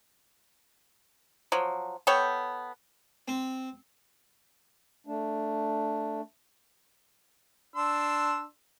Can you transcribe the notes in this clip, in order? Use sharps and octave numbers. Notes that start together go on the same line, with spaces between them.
F3 F#3
B3 A4 C#5 G5
C4
A3 D4
D4 C6 E6